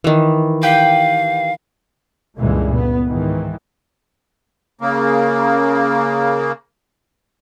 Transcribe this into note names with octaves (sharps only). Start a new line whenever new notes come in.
D#3 E3
G4 B4 F5 G5
C#2 G2 A#2 D3 E3 G#3
B3
G#2 D#3 E3
C#3 A#3